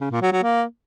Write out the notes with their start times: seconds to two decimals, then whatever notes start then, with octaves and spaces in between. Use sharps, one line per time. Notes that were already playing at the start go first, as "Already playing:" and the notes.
0.01 C#3
0.11 A#2
0.22 F#3
0.32 F#3
0.43 A#3